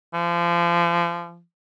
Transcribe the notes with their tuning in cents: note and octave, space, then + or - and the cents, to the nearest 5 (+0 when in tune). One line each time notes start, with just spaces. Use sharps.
F3 -30